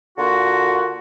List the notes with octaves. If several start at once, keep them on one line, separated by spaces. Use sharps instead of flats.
D3 A#3 F4 F#4